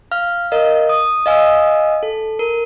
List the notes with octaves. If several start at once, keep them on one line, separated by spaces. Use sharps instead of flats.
F5 F6
A#4 D#5 F5
D#6
D#5 F5 G#5 D#6 E6
A4
A#4